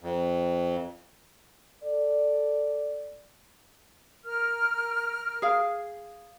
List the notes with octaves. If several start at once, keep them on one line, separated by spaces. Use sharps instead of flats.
F2
A4 D5
A#4 F6
G#4 F5